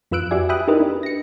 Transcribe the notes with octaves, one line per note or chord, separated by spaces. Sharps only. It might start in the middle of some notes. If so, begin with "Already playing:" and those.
F2 F4 B4 E6 F#6 D7
F#4 G4 D5 E5 G#5
E5 G5 B5 D#6 F#6
D#4 E4 G4 A#4 B4 D#5
D4
A#6 C#7